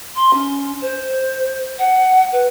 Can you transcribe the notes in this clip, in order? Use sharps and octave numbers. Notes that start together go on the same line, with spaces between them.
C6
C#4
C5
F#5
B4